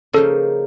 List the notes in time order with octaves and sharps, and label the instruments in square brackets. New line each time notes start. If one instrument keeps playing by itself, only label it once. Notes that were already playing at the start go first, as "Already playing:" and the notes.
[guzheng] C#3 F3 A#3 D#4 [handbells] A4